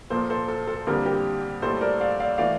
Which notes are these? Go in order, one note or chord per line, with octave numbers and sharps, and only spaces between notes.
A#2 F3 A#3 A4 C5
A4 C5
A4
A4
F2 D3 G3 A#3 G4 A#4
G4 A#4
A2 G3 A#3 A4 C5
A#4 D5
D5 F5
D5 F5
E3 A3 D5 F5